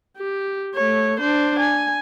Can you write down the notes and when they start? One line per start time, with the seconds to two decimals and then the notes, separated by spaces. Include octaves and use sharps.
0.18 G4
0.74 A3 C#5
1.20 D4 C5
1.59 G#5